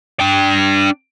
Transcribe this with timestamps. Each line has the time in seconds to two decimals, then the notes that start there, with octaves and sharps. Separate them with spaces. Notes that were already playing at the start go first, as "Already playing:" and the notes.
0.20 D4 G5